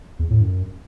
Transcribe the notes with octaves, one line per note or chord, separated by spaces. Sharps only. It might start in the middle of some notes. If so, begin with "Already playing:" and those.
E2
A2
F#2